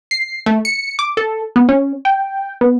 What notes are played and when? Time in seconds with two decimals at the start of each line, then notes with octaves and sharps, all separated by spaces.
0.11 C7
0.46 A3
0.65 C#7
0.99 D6
1.17 A4
1.56 B3
1.69 C#4
2.05 G5
2.61 B3